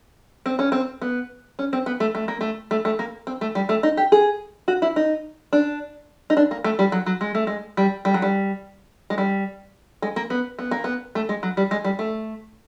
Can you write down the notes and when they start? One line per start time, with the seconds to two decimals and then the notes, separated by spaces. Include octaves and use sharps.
0.46 C4
0.59 C#4
0.72 C4
1.02 B3
1.59 C#4
1.73 C4
1.86 B3
2.00 A3
2.15 A3
2.28 A#3
2.41 A3
2.71 A3
2.85 A3
2.99 A#3
3.27 C4
3.41 A3
3.55 G3
3.69 A3
3.83 D#4
3.97 G4
4.12 G#4
4.68 F#4
4.82 E4
4.96 D#4
5.53 D4
6.30 D#4
6.37 D4
6.51 A#3
6.64 A3
6.79 G3
6.92 F#3
7.06 F#3
7.21 G#3
7.35 A3
7.47 G#3
7.77 G3
8.05 G3
8.14 F#3
8.22 G3
9.10 G#3
9.18 G3
10.02 G#3
10.16 A#3
10.30 B3
10.59 B3
10.71 A#3
10.84 B3
11.15 A3
11.29 G#3
11.43 F#3
11.57 G3
11.71 G#3
11.84 G3
11.99 A3